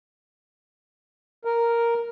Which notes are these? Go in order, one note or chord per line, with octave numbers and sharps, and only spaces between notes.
A#4